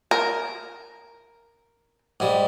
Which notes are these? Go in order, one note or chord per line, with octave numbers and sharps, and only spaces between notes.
A#4
G#2 G3